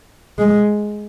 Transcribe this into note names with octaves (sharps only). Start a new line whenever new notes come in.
G#3